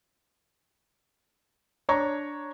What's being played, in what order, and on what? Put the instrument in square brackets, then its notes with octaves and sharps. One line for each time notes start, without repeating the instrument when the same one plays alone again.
[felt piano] D4 C#5 A#5 C#6